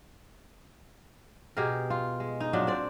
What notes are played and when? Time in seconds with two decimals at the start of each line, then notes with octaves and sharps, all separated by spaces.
1.57 B2 G4 G#4 A#4
1.90 F4
2.20 G#3
2.40 D#4
2.53 A#2 F#3 D4
2.67 C4 D5